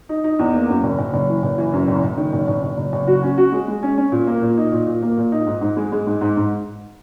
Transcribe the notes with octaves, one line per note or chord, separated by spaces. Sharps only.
D#4
D#4
E2
A#3
F#2
F#1
F#1
F#1
E3
F#1
E3
F#2
F#1
F#1
D#3
F#1
F#1
F#1
F#1
F#1
F#4
C#4
F#4
G#3
G#3
C#4
C#4
A#2
A#3
A#2
D#4
A#2
A#2
A#3
A#2
D#4
G#2
G#2
G#3
G#3
G#2
G#2
G#2